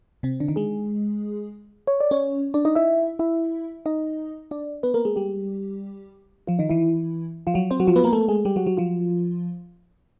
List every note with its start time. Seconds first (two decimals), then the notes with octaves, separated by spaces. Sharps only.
0.23 C3 C4
0.40 D3 D4
0.48 D#3 D#4
0.56 G#3 G#4
1.87 C#5
2.01 D5
2.11 C#4 C#5
2.54 D4 D5
2.65 D#4 D#5
2.75 E4 E5
3.19 E4 E5
3.86 D#4 D#5
4.51 D4 D5
4.83 B3 B4
4.94 A#3 A#4
5.05 G#3 G#4
5.16 G3 G4
6.47 F3 F4
6.59 D#3 D#4
6.69 E3 E4
7.47 F3 F4
7.54 F#3 F#4
7.71 C4 C5
7.80 F#3 F#4
7.87 F3 F4
7.96 B3 B4
8.04 A#3 A#4
8.13 A3 A4
8.28 G#3 G#4
8.45 G3 G4
8.56 F#3 F#4
8.67 F#3 F#4
8.77 F3 F4